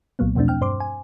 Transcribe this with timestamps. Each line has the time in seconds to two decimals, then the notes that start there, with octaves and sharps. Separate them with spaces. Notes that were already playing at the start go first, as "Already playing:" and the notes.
0.19 C2 A#2 F#3 A#3 B3
0.35 E2 B2 F3 A3 C4 D4
0.48 C4 G5 F6
0.61 G2 C5 C6 D6
0.80 G#5